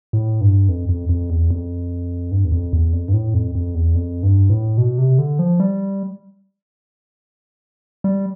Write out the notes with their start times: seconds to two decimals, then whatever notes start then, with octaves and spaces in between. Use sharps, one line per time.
0.13 A2
0.41 G2
0.69 F2
0.89 F2
1.09 F2
1.30 E2
1.50 F2
2.31 G2
2.45 E2
2.52 F2
2.73 E2
2.93 F2
3.08 G2
3.14 A2
3.34 F2
3.55 F2
3.75 E2
3.95 F2
4.23 G2
4.50 A2
4.77 B2
4.98 C3
5.18 D3
5.39 F3
5.60 G3
8.04 G3